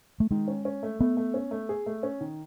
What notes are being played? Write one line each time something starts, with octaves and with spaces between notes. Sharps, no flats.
A3
D#3 G#3
C#4
C#4
A3
A3 B3
A3
C#4
A3
G#4
A3
C#4
D#3